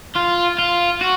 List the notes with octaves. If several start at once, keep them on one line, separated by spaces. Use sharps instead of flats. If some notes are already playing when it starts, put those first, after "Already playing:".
F4
F4
F#4